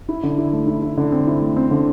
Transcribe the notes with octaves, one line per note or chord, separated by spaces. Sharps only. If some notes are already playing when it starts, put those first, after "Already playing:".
E4
D3
E4
A3
E4
E4
D3
C4
E4
A3
C4
D3